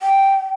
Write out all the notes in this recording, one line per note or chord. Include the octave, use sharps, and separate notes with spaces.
G5